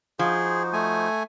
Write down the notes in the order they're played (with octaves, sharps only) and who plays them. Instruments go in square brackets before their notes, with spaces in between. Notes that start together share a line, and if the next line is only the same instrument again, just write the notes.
[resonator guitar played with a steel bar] F3 [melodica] D#4 F#4 C5 [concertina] G#4
[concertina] A3 G#5